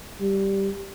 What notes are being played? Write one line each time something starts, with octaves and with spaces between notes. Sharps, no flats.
G3